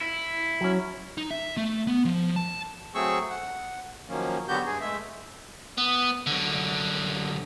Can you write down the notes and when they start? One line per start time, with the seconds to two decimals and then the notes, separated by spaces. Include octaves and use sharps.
0.01 E4
0.61 F#3 C#4
1.18 D#4
1.30 E5
1.57 A3
1.87 B3
2.05 F3
2.36 A5
2.95 F#3 A3 C4 G#4 C#6 E6
3.30 F#5
4.09 D#3 F3 F#3 A#3 C#4
4.48 D3 F#3 B3 F#4 G4 G6
4.66 G2 G#4
4.81 G#3 A3 E5
5.78 B3
6.27 F#2 D3